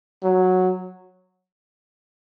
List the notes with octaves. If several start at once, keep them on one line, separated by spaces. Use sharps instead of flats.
F#3